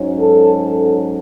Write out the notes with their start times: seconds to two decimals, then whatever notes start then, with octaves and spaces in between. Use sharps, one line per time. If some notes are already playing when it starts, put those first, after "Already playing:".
Already playing: G#2 F#3 C#4
0.19 A4
0.63 A4